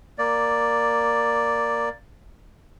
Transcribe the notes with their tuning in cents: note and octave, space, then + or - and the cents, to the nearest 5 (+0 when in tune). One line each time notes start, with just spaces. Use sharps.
A#3 +0 D5 +0